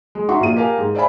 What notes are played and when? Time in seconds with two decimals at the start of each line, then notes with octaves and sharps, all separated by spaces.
0.15 G#3
0.29 D#4 F#4 E5 F#5 C6 C#6
0.41 A#1 F4 D#7
0.56 G4 A#4 F5 G#5
0.78 G#2
0.95 C5 D5 E5 F5 G#5 B5